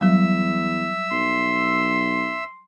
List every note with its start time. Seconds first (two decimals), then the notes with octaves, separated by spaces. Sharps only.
0.01 E2 F#3 G3 E5 E6
1.11 B1 C6